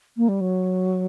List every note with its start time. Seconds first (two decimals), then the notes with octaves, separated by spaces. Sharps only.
0.17 A#3
0.28 G3
0.41 F#3